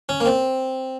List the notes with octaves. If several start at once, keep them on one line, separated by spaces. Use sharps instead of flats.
C#4
A#3
C4